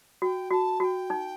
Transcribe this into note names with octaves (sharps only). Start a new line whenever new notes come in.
F#4 G5
F#4 A5
F#4 G5 A5
D#4